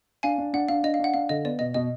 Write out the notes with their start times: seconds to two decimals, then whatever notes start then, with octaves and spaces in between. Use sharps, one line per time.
0.23 D4 F5 G#5
0.38 D4
0.54 D4 F#5
0.68 D4 F5
0.83 D4 D#5
0.94 F5
0.99 D4 F#5
1.14 D4 F5
1.29 D3 D#5
1.45 B3 D5
1.59 B2 D#5
1.74 B2 D#5